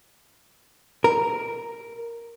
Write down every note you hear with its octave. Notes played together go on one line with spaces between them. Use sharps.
A#4